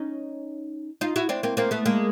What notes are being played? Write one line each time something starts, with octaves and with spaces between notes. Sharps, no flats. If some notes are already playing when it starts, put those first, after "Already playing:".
Already playing: C#4 D#4
D#4 F4
E4 F#4
C4 D4
A#3 C4
A#3 C4
A3 B3
G#3 A#3